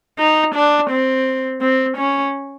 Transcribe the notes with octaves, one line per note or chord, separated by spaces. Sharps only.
D#4
D4
C4
C4
C#4